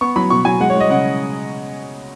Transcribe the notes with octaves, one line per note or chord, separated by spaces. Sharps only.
B3 C#6
F#3 B5
B2 C#6
F#3 G#5
G#3 F#5
C#5
G#3
D#5
C#3 F#5